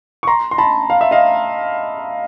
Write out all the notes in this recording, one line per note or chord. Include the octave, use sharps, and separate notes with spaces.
C#6
A#5 C6
C6
A5 B5
F5
E5
D#5 F5